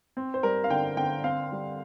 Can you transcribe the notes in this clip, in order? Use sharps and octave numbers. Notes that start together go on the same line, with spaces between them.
C4
C5
G3 A#4
F5
D3 G5
D3 G5
C4 F5
G3